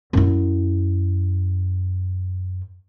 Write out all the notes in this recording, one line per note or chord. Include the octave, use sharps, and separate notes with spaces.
F#2 E4